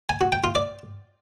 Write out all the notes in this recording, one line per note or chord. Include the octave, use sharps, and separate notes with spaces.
G#5
F#4
G5
F4
D5